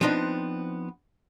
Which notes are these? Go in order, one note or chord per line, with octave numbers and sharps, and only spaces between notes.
F3 B3 C4 D4 D#4